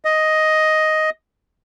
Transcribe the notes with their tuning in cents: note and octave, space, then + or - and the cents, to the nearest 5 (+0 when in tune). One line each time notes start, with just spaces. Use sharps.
D#5 +5